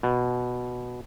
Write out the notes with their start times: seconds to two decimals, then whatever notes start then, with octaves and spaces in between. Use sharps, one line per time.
0.03 B2